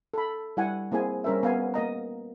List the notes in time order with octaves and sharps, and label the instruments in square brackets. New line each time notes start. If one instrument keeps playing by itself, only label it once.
[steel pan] A4 B5
G3 E4 F#5 G#5
A#3 C4 E4 G#4 G#5
G3 C#4 A#4 C5 E5
B3 F5 G#5
A#3 A#4 D#5 A#5